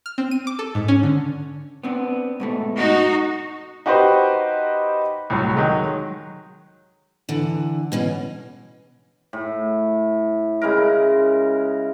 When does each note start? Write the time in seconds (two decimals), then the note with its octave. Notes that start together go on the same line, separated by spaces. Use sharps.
0.06 F6
0.18 C4
0.31 D#7
0.47 D6
0.59 A4
0.75 G#2
0.88 C#4
1.03 D3
1.83 B3 C4 D4
2.40 G#2 B2 A3
2.77 D#4 F#4
3.86 D#4 F#4 G4 B4 C5 D#5
5.30 C2 A2 F#3
5.55 D#3 F#3 G#3
7.29 D3 E3
7.92 B2 E3 C#4
9.33 A2
10.62 C#3 G#3 E4 A#4